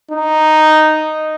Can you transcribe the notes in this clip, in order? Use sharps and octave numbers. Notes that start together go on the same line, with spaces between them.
D#4